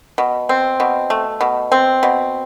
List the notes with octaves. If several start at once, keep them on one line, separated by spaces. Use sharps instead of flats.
B2
C4
B2
A3
B2
C4
B2